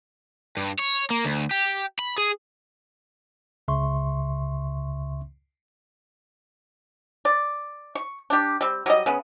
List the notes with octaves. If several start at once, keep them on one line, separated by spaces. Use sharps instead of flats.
G2
C#5
A#3
D2
G4
B5
G#4
C#2 C#3 E5 C6 C#6
D5
C#6
D4 G4
G3 C4
F#3 G3 D#5
C#3 B3